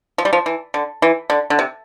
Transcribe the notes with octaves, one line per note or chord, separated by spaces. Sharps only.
F3
G3
F3
E3
D3
E3
D3
D3
C3